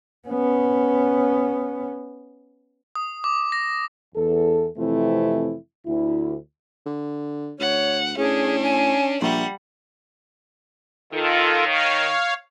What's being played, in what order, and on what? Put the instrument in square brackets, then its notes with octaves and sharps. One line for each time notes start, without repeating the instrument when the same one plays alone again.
[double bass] B3 C#4
[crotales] D#6
D6
A#6
[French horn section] E2 A4
F2 C3 E3 A3 C4 E4
D2 E4
[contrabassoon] D3
[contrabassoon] D2 [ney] C#5 [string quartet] F#5
[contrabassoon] A2 [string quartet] C#4 D4 [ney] G#4
[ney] G#5
[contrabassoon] A#1 [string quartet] G3 F#5 [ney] E5
[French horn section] D#3 [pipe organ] F4 A4
[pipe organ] C#5 F5